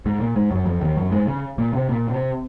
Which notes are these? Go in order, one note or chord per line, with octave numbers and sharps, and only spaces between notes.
G#2 G#3
A#2 A#3
G#2 G#3
F#2 F#3
F2 F3
D#2 D#3
F#2 F#3
G#2 G#3
C#3 C#4
A#2 A#3
C3 C4
A#2 A#3
C3 C4